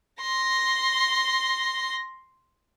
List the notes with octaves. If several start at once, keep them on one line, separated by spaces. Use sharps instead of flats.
C6 A#6